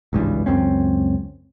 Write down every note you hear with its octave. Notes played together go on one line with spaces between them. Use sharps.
G#1 C#2 G2 E3
C#2 F#2 C4 C#4